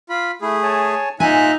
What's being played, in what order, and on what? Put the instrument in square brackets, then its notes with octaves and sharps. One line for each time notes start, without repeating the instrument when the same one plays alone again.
[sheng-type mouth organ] F4 B5
[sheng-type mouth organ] A3 G#4 [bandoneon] E4
[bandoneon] C#5 G#5 A5
[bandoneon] A#2 F4 [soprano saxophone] D#4 [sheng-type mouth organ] E5 F#6 [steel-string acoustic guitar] G#5